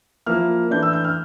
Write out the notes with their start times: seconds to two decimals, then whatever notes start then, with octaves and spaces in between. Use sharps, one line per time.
0.26 F3 A#3 E4 F6
0.70 E3 A3 D4 G6
0.83 E6
0.93 G6
1.04 F6